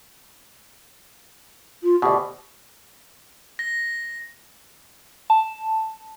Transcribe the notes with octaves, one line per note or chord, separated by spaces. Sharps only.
F4
D2 B2 G4
A#6
A5